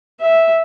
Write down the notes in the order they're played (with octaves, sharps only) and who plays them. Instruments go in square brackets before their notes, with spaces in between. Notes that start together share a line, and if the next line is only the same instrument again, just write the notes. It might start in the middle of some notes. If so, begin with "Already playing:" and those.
[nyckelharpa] E5